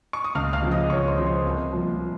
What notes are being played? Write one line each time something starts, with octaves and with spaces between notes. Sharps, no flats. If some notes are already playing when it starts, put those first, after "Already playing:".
C#6
D#6
C#2 F5 F6
F5 F6
C#3 F3
D#5 D#6
C#2 C#5 C#6
C5 C6
C#3 F3
C5 C6
C2
A#2 F3